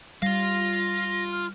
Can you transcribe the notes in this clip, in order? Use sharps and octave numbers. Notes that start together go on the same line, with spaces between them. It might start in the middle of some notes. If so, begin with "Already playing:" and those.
G3 F4 F5 A#6
F6